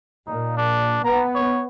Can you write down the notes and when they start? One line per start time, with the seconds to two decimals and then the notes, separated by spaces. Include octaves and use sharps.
0.27 A#2 D#4
0.57 D4
1.04 B3 A#5
1.35 C#5